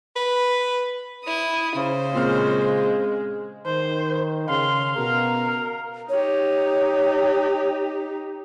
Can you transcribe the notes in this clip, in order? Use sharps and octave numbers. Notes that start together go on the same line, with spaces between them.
B4
E4 D#6
C#3 C5
A#2 G#3 C4 F6
D#3 C5
C#3 F5 C6
B2 A#4
D#4 G4 C#5